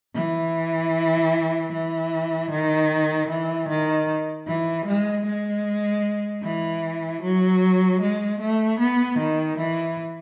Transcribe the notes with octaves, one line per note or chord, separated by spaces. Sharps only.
E3
E3
D#3
E3
D#3
E3
G#3
G#3
E3
F#3
G#3
A3
B3
D#3
E3